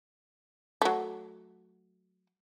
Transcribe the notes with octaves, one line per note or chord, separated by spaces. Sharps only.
F#3 A3